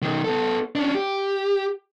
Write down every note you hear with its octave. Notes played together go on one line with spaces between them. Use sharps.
B1 D#3
B3 A4
C#4 D4
G4